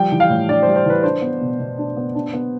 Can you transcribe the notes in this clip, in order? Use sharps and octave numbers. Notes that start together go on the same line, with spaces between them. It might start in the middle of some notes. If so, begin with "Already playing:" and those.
Already playing: F3 G3 G5
E3
F5
A2
D4 D5
C5
G3
C5
E3 B4
D4 C5
B3
B2
B2
D4
B3
D4
B3